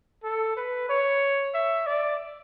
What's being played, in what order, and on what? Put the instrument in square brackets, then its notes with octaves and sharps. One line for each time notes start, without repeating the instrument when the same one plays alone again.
[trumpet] A4
B4
C#5
E5
D5